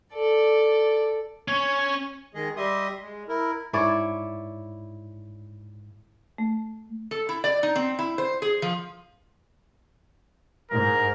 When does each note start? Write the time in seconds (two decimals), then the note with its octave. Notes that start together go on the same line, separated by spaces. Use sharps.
0.14 A4 D5
1.48 C#4 C#5
2.34 D#3 G#3 G#4 D#5
2.57 G3 G4 D#5 E5 C6 D#6
3.02 G#3
3.28 E4 A#4
3.73 G#2 E4 C#5 D5
6.38 A3
7.11 A4
7.29 E4
7.44 D5
7.63 D#4
7.76 C4
7.99 E4
8.18 C5
8.42 G#4
8.62 F3
10.71 G#2 A#4